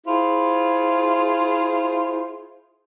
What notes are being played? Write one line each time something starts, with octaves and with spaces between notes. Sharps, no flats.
E4 F4 G#4 C5